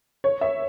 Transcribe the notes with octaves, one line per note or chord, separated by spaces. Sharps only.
C#5
E5